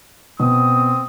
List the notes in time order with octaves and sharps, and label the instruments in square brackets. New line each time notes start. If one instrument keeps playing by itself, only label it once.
[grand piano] B2 [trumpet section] C4 D#6